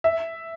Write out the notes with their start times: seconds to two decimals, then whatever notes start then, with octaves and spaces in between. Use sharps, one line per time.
0.04 E5